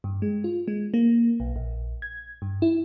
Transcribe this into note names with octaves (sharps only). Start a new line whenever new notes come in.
G2
G#3
F4
G#3
A#3
B1
A#1
G#6
G2
E4